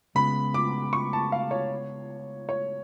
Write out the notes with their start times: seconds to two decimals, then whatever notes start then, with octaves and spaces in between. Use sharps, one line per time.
0.15 C#3 G#3 B3 B5
0.54 D6
0.93 C#6
1.13 A5
1.32 F5
1.51 C#5
2.49 C#5